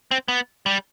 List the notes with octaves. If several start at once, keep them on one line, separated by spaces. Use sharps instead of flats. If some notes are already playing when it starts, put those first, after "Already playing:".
C4
B3
G3